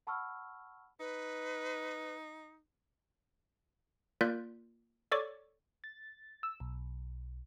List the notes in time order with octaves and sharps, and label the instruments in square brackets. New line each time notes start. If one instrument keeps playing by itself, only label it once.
[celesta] F#5 A5 B5 C#6 E6 F6
[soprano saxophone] D#4 [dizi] B4
[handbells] A#3 F4 A#4 D5 F#6 G6
A4 C#5 D5 C#6 D6
[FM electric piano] A6
E6
B1